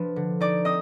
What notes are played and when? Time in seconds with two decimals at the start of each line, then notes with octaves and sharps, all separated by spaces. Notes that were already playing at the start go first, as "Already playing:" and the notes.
Already playing: F3 D4 B4
0.16 D3
0.40 D#4 D5 D6
0.65 C4 D#5 D#6